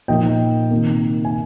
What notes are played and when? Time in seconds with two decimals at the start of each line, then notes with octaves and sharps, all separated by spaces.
0.08 A#2 F3 A#3 D#4 D#5 G5
0.71 C3 D#3 A#3
1.25 G#5